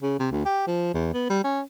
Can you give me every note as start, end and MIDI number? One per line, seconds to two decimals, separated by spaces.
0.03 0.19 49
0.19 0.27 48
0.31 0.43 38
0.45 0.63 67
0.67 0.92 53
0.94 1.13 40
1.14 1.25 59
1.30 1.39 55
1.44 1.61 61